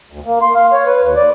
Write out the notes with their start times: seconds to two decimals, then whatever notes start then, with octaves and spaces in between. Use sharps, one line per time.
0.11 D2
0.26 A#3
0.42 C6
0.55 F5
0.72 C#5
0.86 B4
1.01 D#2
1.16 D5